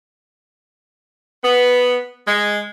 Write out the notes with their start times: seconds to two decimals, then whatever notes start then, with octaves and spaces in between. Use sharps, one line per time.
1.44 B3
2.28 G#3